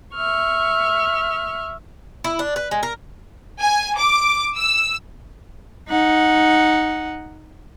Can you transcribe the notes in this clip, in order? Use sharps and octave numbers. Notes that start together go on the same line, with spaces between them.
E5 C#6 F6
E4
D4
B4
G#3
A#4
G#5
D6
E6
D#4 F#5